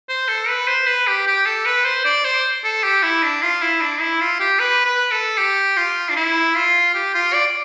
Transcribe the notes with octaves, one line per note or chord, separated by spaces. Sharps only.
C5
A4
B4
C5
B4
G4
G4
A4
B4
C5
D5
C5
A4
G4
E4
D4
F4
E4
D4
E4
F4
G4
B4
B4
A4
G4
F4
D4
E4
F4
G4
F4
D5